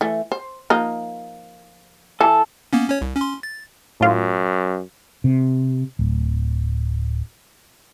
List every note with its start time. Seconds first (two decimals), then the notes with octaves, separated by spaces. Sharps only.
0.01 E3 A3
0.32 C5
0.70 F3 A#3 D#4
2.21 E3 A4
2.73 A#3 B3 C#4
2.90 C#4 C#5
3.01 C2
3.17 C#4 C6
3.43 A6
4.01 F#2 A2 F4
5.24 C3
5.99 D1